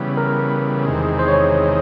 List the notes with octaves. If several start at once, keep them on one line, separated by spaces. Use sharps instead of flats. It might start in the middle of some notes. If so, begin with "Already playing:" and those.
Already playing: C#3 E3 G3 B3
A#4
E2 C3 D#3 G#3
C5
C#5